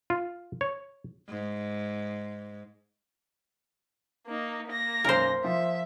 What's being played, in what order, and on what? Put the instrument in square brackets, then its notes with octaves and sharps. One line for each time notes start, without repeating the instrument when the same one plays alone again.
[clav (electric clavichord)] F4
C#5
[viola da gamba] G#2
[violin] A#3 D#4
A#3 A#6
[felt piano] B1 F#2 C7 [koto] A#4 C5
[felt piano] F3 [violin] E5